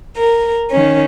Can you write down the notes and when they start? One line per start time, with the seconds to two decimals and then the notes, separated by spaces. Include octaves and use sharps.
0.16 A#4
0.70 D#3 C#4